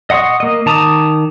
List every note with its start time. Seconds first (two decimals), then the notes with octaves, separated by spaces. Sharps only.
0.10 D#5 F#5 C6 C#6 D#6
0.40 A#3 D#5
0.66 D#3 A5 A#5 D6 D#6